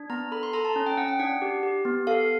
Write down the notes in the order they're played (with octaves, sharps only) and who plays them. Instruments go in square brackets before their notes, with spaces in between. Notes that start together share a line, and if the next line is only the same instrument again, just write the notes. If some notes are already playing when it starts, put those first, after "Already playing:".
Already playing: [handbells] D4
B3 A#5
A4 B5
C6
A4 A#5
A5
C#4
G5
C#4 F#5
G5
D4 F#5
G4
G4
B3
A4 F5